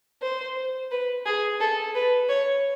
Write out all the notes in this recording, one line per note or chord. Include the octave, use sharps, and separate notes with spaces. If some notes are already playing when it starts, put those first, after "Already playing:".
C5
B4
G#4
A4
B4
C#5